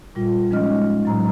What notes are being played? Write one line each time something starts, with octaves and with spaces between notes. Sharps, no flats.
A#2 G3 F4
F3 G#3 C#4 D#4 D#5 F6
A2 F#3 A#5